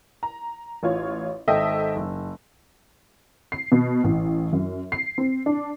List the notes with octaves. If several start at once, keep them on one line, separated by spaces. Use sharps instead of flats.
A#5
A1 F4 C#5
G#1 A4 D#5 E5 G5 E6
F#1
C7
B2
A1
F#2
C7
C4
D4